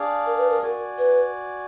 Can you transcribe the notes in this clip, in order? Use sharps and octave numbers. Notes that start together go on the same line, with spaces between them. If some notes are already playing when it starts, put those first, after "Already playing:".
Already playing: D4 G#4 D5 F5
A#4
B4
A#4
F#4 D5 G#5
B4